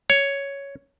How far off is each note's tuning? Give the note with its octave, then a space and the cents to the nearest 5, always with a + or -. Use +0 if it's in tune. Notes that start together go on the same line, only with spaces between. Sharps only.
C#5 +5